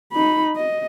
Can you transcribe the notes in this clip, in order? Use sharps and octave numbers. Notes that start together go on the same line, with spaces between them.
D#4 B5
D#5